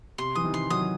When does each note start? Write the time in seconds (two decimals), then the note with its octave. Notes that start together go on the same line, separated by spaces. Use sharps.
0.18 C3 C6
0.35 E3 D#6
0.44 C3 D#3
0.54 C6
0.70 D#3 F#3 D#6